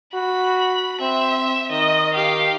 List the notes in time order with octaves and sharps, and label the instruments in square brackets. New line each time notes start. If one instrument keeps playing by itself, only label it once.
[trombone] F#4 [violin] B5
[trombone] C4 [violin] E5
[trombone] D#3 [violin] D#5
[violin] G4 F5